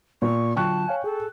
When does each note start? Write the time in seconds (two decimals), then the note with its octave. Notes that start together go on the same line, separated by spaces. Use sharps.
0.22 A#2 C#6
0.56 D3 F#3 F4 G5 A5 C#6 F#6
0.88 C#5 F5 G#5
1.04 G#4 A4